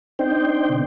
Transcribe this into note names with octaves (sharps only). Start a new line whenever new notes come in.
C4 D4 D#4 C5 G5
B2 D3